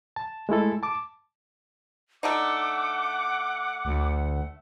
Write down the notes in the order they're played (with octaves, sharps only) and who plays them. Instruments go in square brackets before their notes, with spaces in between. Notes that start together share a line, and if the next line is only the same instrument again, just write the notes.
[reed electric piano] A5
G#3 A3 E4 A4
A5 D6
[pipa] A3 D4 D#4 [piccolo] F#5 [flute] D6
[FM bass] D2